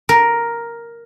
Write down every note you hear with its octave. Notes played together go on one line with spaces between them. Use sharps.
A#4